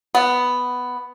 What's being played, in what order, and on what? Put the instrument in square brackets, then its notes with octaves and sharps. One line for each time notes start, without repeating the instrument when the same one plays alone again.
[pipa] B3